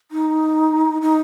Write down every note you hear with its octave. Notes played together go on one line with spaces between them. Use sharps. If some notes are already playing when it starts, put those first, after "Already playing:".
D#4
D#4